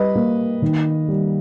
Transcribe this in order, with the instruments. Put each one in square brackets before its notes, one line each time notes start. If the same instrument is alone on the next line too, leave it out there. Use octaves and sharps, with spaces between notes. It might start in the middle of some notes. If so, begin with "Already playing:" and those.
Already playing: [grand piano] G3 [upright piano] B4 D#5
[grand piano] A#3
D#3
G3